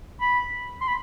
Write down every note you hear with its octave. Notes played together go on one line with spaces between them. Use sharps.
B5
C6
B5